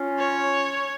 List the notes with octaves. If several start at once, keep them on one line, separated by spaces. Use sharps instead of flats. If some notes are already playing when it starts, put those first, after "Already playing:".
Already playing: C#4 F4
C#5